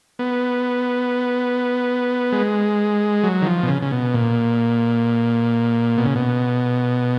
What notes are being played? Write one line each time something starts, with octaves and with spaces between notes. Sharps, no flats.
B3
G#3
F#3
D#3
F3
B2
C#3
C#3
B2
A#2
B2
C#3
B2